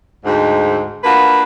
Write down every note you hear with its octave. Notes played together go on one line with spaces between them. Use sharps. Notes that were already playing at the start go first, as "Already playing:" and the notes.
D2 G#2
A#3 D4 F4 F#4 B4